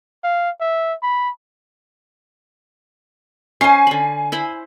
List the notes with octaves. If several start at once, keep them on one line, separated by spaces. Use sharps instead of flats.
F5
E5
B5
C#4 C5 G#5 C7
D3 B5
E4 C5 B5